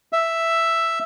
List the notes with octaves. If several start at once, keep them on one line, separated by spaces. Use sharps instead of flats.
E5